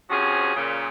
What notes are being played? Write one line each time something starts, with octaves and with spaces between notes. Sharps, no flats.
C3 F3 C#4 F#4 G#4
A#2 C#3